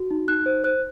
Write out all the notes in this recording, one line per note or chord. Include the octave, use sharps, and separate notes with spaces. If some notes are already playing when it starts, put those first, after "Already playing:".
Already playing: F#4
D#4
D#4 F#6
C5
C5 F#6